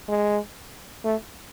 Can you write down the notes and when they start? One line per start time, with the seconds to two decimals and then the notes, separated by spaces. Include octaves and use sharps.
0.09 G#3
1.05 A3